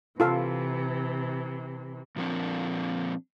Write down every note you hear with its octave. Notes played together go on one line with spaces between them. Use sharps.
C3 E3 F4 A4 F5
A#2 F3 A#3 C4 D4